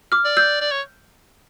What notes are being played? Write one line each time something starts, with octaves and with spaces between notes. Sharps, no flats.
D6 F6
D5
E6 G6
D5
C#5